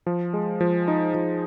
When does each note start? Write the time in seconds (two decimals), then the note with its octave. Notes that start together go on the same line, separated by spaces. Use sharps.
0.07 F3
0.34 G#3
0.61 F3
0.88 D#4
1.15 F3